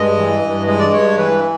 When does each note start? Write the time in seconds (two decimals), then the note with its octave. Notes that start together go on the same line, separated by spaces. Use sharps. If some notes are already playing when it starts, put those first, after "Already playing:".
Already playing: G2 G#3 D#5
0.17 E3
0.43 G2
0.67 G#3 D#5
0.79 D5
0.92 G2 C#5
1.17 E3 B4